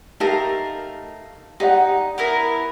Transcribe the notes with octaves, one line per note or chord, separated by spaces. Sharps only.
A3 D#4 G4 A#4 F5 A5
D#4 G4 D5 F#5
B3 E4 A#4